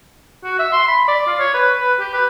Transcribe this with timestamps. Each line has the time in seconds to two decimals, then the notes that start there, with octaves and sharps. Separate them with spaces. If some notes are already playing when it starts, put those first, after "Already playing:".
0.44 F#4
0.59 E5
0.73 C6
0.88 B5
1.08 D5
1.27 F4
1.40 C#5
1.54 B4
1.81 B4
2.00 G4
2.14 B4